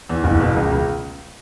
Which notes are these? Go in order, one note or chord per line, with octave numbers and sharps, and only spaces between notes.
E2
F#1
B2
C#2
C#2